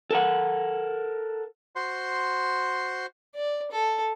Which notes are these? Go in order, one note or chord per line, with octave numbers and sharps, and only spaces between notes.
A4 A#4 F#5
F#4 C5 C6
D5
A4